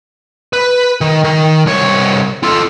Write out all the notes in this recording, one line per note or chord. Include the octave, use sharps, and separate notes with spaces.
B4
D#3
D#3
C2 C#5
F4 A4